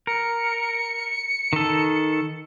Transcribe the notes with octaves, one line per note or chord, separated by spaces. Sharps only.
A#4 C#7
D#3 A4